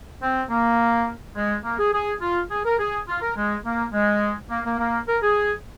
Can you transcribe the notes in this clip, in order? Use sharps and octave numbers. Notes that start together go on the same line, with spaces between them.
C4
A#3
G#3
A#3
G#4
G#4
F4
G#4
A#4
G#4
F4
A#4
G#3
A#3
G#3
A#3
A#3
A#3
A#4
G#4